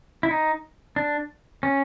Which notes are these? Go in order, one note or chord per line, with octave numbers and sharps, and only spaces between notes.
E4
D#4
D4
C#4